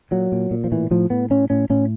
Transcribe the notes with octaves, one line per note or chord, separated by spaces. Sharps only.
A#2 F#3
A#2
A#2
F3
A2 E3
A2 F3
A2 B3
A2 C#4
A2 C#4
A2 C#4